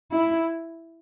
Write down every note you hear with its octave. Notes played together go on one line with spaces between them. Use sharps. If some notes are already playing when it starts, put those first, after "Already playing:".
E4